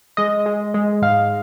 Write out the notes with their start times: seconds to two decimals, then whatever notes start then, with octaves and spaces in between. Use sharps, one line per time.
0.17 G#3 D#5
0.46 G#3
0.74 G#3
1.02 G#2 F5